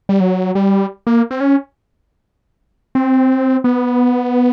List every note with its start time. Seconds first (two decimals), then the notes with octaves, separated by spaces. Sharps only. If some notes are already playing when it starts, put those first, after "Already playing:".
0.09 G3
0.20 F#3
0.55 G3
1.07 A#3
1.31 C4
1.41 C#4
2.95 C4
3.64 B3